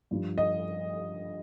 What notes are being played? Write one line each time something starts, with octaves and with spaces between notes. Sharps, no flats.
G2 F3
D#5